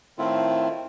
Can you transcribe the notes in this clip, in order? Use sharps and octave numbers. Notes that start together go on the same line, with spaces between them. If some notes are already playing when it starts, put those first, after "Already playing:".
A2 D#3 A3 C4 E4 F4